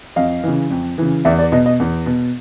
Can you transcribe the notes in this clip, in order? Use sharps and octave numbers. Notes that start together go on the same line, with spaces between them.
F2 D#5 F5
C#3 E3
F2
C#3 E3
E2 D5 E5
D5
B2 D#5
D#5
E2
B2